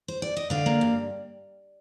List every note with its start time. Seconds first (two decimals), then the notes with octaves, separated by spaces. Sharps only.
0.08 C5
0.22 D5
0.36 D#5
0.50 D3 D5 F5
0.66 A#3
0.81 G2